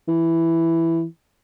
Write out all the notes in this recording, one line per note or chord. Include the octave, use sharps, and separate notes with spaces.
E3